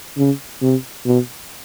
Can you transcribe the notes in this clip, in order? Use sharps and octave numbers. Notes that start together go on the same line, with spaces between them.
C#3
C3
B2